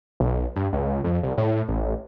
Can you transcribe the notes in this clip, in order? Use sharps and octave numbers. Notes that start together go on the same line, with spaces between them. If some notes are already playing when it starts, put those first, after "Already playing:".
B1
G2
C#2
F2
C2
A2
A1